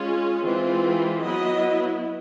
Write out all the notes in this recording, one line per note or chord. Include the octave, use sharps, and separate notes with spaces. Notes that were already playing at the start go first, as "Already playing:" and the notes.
Already playing: G#3 C#4 F4
E3 G#3 C4 F4
F#3 B3 E4 D#5